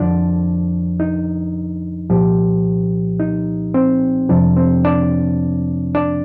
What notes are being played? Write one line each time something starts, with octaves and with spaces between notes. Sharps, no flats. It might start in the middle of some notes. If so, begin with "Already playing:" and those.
Already playing: F2 D3 F3 D4
D#4
C2 A#2 F3 G4
D#4
C4
F2 C3 F3 D4
C4
D4
D4